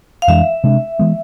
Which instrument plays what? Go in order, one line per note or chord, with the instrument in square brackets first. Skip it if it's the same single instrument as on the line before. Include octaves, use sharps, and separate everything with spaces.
[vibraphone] F5
[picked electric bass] F2 E3 G#3 D4 [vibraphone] E5
[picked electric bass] C3 G#3 D4
E3 G#3 B3